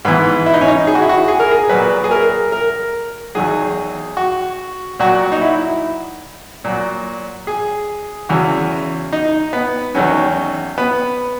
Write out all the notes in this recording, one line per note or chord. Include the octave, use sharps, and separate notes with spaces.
G#2 E3 B3
E4
D#4
C#4
D#4
G#4
F#4
E4
F#4
G#4
A#4
G#4
A#2 F#3 B4
G#4
A#4
A#4
E2 D#3 F#3 G#4
F#4
A#2 F#3 F#4
D#4
E4
A#2 F#3
G#4
E2 C#3 E3 F#4
D#4
B3
E2 D#3 F#3 C#4
B3